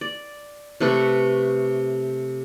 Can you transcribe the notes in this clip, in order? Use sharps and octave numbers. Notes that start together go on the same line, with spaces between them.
D5
C3 A3 B4 C#6